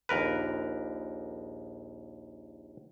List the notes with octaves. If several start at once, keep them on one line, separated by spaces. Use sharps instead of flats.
A#1 D#2 A#4 B4